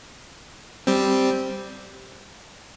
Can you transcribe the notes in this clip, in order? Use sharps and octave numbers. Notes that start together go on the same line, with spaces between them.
G3 C4